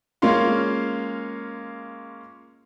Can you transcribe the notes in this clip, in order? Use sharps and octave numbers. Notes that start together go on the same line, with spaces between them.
G#3 A#3 C#4 F4 F5 C6